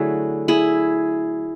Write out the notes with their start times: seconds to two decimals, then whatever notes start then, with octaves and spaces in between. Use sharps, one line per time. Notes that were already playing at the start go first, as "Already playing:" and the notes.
Already playing: D3 F#3 A3 E4 G#4
0.48 E4 G#4